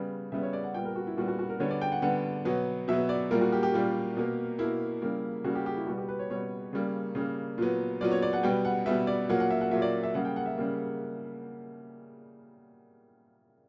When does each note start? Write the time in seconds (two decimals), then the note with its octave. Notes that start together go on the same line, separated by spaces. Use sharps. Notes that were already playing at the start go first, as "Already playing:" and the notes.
Already playing: C#3 G3 B3
0.32 C#3 G3 B3 E5
0.42 C#5
0.53 D5
0.64 F#5
0.74 A#2 G3 B3 G5
0.85 A#4
0.96 F#4
1.07 E4
1.17 A#2 G3 B3 F#4
1.28 F#4
1.39 F#4
1.49 A#4
1.60 D3 G3 B3 C#5
1.71 D5
1.81 G5
1.92 F#5
2.02 D3 G3 B3 F#5
2.45 B2 F#3 B3
2.88 B2 F#3 B3 E5
3.09 D5
3.31 A#2 G3 A#3 A#4
3.41 F#4
3.52 G4
3.63 G4
3.74 A#2 G3 A#3
4.17 B2 A#3
4.58 B2 A#3 E4
5.02 C#3 G3 A#3
5.44 C#3 G3 A#3 F#4
5.55 G4
5.66 G4
5.77 E4
5.87 B2 G3 B3 F#4
5.98 G4
6.08 B4
6.19 C#5
6.30 B2 G3 B3 C#5
6.73 C#3 G3 A#3
7.15 C#3 G3 A#3
7.58 A#2 F#3 B3
8.01 A#2 F#3 B3 D5
8.11 C#5
8.22 D5
8.33 F#5
8.43 B2 G3 B3 G5
8.65 F#5
8.86 B2 G3 B3 E5
9.07 D5
9.29 A#2 F#3 A#3 F#5
9.40 F#5
9.51 E5
9.61 F#5
9.71 A#2 F#3 A#3 E5
9.82 D5
10.03 E5
10.14 C#3 G3 A#3 F#5
10.25 G5
10.36 F#5
10.46 E5
10.58 C#3 G3 A#3